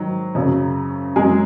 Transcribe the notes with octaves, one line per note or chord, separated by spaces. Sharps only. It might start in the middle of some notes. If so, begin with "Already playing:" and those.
Already playing: G#2 D#3 F#3
F#2 C#3 F#3
F#2 F#3 G#3 G#4